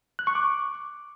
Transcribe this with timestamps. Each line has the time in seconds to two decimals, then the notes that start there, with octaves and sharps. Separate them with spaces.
0.19 F#6
0.27 C#6
0.35 D6